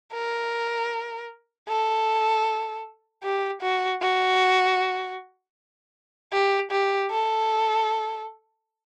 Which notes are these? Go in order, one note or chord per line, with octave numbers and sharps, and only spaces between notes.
A#4
A4
G4
F#4
F#4
G4
G4
A4